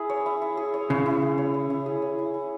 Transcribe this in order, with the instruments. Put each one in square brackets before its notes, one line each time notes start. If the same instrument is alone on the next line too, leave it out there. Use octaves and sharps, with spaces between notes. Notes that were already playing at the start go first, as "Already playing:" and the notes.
Already playing: [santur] E4 G#4
C#5
E4
E4
G#4
C#5
[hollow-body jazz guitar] C#3 [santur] E4
[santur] E4
G#4
C#5
E4
E4
G#4
C#5
E4
E4